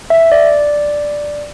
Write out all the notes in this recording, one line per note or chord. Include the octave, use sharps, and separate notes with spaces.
E5
D5